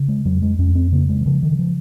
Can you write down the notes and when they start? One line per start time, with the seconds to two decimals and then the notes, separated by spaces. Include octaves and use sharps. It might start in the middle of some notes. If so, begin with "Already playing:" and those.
Already playing: C#3
0.08 G#3
0.25 F2 F#3
0.42 G#3
0.59 F2 C#4
0.75 C4
0.92 C#3 A#3
1.09 G#3
1.21 D#3
1.26 C#3 F3
1.43 D#3
1.59 F3